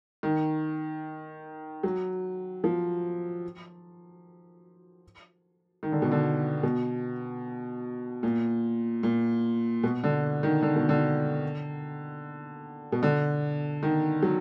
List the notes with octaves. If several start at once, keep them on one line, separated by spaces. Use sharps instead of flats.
D#3
F#3
F3
D#3
D3
B2
D3
B2
A#2
A#2
B2
D3
D#3
D3
B2
D3
B2
D3
D#3
F#3